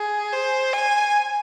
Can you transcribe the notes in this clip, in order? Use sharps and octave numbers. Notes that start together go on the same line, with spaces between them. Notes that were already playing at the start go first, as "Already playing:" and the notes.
Already playing: G#4
C5
G#5